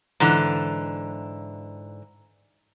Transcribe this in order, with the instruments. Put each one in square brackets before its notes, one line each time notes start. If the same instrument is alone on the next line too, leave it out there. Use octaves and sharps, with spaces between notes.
[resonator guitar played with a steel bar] G#2 D3 E3 [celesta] A#5 F#6